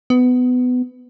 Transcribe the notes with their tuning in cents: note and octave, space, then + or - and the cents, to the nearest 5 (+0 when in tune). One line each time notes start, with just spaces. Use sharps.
B3 +20